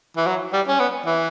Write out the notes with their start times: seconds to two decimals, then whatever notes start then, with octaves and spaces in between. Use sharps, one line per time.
0.17 E3
0.27 F#3
0.53 G3
0.68 C#4
0.80 B3
1.06 E3